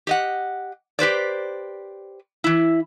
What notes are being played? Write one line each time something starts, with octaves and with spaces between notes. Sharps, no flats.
G4 D#5 F#5
G4 B4 C5 D5
E3 E4